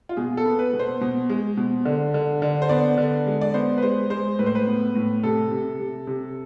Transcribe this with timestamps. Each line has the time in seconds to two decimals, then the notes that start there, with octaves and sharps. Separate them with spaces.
0.09 F4
0.17 B2 G#4
0.37 A4
0.45 B3
0.59 B4
0.73 B2
0.79 C5
1.01 B2
1.30 G#3
1.57 B2
1.85 D3
2.14 D3
2.42 D3
2.62 C5
2.69 B3 D5
2.98 D3
3.27 G#3
3.41 D5
3.54 B3 C5
3.78 B4
3.82 G#3 C5
4.10 G#3 C5
4.39 A2 B4
4.46 C5
4.55 B4
4.67 B3
4.95 A2
5.23 C3 A4
5.51 C3
5.79 C3
6.07 C3